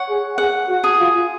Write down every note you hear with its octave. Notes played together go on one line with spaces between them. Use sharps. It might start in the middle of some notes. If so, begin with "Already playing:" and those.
Already playing: C#5 F#5
G#4
G#4 F#5
F#4
G#4
F4